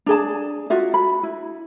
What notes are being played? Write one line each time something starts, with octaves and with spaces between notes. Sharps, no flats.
D4 G#4 A5
F4 F#4 E5
B5
E4